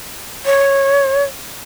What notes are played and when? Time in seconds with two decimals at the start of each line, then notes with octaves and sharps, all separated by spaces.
0.45 C#5